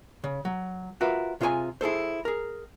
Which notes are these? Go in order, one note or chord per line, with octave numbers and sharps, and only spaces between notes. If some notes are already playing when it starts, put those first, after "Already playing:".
C#3
F#3
F4 F#4 A#4 B4 E5
C3 F4 G#4 C5 G#5
E4 G#4 A4 C5
G#4 A#4